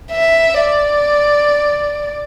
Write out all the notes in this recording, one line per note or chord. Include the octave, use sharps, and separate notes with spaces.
E5
D5